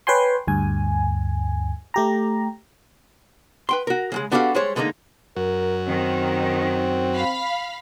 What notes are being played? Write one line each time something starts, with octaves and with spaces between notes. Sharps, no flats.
B4 C#5 G5 G#5 C6
D2 G2 G#5
A3 G4 A#5
B4 G5 C6
F#4 A#4
C#3 F#3 G#3
B3 D4 F#4 G4 A4 F5
G3 G#3 C5 C#5
D3 G#3 A#3 C#4 D#4
F#2 F#4 A#4
D#3 C4
F5 B5